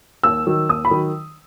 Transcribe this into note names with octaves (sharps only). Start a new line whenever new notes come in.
D#2 E6
D#3 F#3
D#2 D#6
B5
D#3 F#3